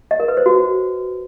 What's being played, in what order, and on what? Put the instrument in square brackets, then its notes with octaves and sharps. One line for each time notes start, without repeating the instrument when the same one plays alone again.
[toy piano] D#5
A#4
B4
C5
F#4